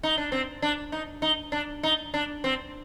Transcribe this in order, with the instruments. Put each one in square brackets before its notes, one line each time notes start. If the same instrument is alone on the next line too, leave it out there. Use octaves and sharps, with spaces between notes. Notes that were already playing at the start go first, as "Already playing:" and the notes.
[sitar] D#4
D4
C4
D4
D#4
D#4
D4
D#4
D4
C4